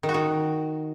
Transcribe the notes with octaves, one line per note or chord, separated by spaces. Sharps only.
D#3
F#4
D#3